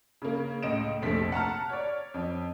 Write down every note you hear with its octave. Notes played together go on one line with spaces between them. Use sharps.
C#3 A#3
C#2 A2 D#5 D7 E7
F1 A#1 A3 B6
F#5 A5 A#5 F6
C#5 D5
F2